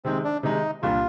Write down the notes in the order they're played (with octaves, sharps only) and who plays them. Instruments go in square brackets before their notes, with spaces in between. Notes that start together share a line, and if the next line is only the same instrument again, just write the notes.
[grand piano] C3 D#3 G#3 [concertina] C4
[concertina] D4
[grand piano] C3 D#3 G#3 [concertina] D#4
[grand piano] C2 A#2 G3 D4 [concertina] F4